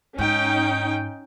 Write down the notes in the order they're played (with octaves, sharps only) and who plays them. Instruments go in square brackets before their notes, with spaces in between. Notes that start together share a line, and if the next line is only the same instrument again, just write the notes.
[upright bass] G#2 [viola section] C#4 D#4 G5